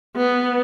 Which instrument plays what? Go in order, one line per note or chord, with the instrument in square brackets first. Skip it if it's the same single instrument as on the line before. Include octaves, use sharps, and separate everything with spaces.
[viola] B3